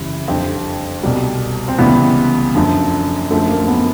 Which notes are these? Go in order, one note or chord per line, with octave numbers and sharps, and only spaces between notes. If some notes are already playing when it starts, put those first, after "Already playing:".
Already playing: F#2 C#3 E3 G3 E4
F2 D3 G3 C4
C2 B2 G3
C4
C#2 C3 E3 G3 B3
F#2 D3 F3
F#2 D3 F3 A3
A#3
B3